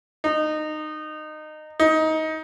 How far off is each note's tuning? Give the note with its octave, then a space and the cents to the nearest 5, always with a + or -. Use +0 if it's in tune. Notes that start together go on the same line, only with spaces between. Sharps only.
D#4 -20
D#4 +20